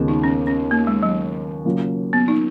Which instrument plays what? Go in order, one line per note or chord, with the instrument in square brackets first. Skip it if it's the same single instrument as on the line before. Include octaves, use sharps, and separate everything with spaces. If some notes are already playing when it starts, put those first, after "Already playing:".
Already playing: [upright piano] D#2 C#3 G#3 B3 F4
[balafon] D#4
C#4
C#4
A#3
G#3
F#3
[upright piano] C#3 F#3 A#3 C#4 F4
[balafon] B3
D#4